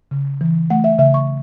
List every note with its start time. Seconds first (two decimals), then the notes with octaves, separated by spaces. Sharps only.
0.11 C#3
0.41 E3
0.70 A3 F#5
0.84 E5
0.99 C#3 E5
1.14 C#6